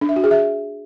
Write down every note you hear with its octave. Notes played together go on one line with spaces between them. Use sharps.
D4
E5
F#4
G#4
E5